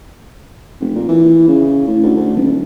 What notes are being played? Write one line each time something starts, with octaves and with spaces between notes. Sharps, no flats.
F1
A#2
E3
C#3
A2
D2
D2
D#1